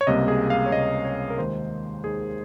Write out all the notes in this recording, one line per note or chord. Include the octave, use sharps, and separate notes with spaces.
C#5
C#2 C3 G3 A#3 D#5
G#4
F5
C#5
C#2 C3 G3 A#3 D#5
C#5
A#4
D#2 D#3 G#3 C5
D#2 D#3 G#3 G#4